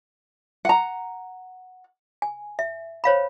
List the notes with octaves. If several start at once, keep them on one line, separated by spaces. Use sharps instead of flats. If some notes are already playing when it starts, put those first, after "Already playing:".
F#5 A#5
G#5
E5
C5 C#5 F5 B5